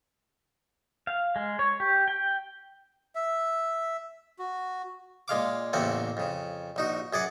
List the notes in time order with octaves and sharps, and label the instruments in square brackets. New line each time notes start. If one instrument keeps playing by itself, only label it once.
[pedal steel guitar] F5
G#3
C#5
G4
G5
[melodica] E5
F#4
[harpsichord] A#2 G#3 F5 D6
A1 E2 C#3 A#3 C4 F#5
F2 C#3
A#1 D#4 F#4
F#2 G#4 D5 F#5